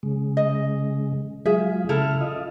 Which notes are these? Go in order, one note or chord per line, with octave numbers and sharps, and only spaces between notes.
C#3 G#3
D#5
F#3 G#3 F4 G#4 E5
C#3 E4 A4 F6
F4 D#5